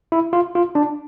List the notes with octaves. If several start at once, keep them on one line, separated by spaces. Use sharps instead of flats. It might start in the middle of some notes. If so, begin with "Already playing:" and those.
E4
F4
F4
D4